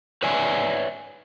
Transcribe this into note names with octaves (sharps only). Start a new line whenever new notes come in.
B4 C#5 D5 E5 G#5